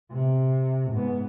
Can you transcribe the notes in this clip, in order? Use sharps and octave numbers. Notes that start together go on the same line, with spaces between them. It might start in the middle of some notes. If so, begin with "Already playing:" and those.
C3
G#2 B3